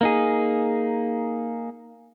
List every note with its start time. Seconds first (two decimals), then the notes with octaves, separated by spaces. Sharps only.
0.01 A#3 D#4 G#4